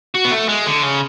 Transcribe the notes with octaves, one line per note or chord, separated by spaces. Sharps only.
F#4
B3
A3
G#3
D3
C#3